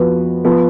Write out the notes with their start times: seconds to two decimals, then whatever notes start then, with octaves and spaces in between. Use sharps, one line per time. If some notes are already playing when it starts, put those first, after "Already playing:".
Already playing: F2 F3 B3 F#4 B4
0.45 F3 B3